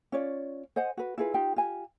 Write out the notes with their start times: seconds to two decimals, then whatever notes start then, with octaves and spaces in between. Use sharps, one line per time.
0.12 C#4 F4 C#5 D5
0.76 C5 D#5 F#5 G#5
0.97 F#4 B4
1.18 E4 F4 G#4 B4
1.34 D#4 F4 G4 G5
1.56 F4 G4 G#5